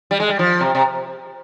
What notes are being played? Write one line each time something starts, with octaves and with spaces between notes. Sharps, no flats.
G3
G#3
G3
F3
C3
C3